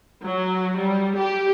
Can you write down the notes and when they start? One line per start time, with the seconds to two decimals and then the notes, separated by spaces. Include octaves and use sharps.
0.24 F#3
0.78 G3
1.17 G4